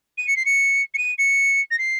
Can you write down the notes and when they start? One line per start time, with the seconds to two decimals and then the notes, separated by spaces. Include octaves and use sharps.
0.18 D#7
0.27 C#7
0.36 C7
0.45 C#7
0.94 C#7
0.98 D#7
1.18 C#7
1.71 A#6
1.78 C7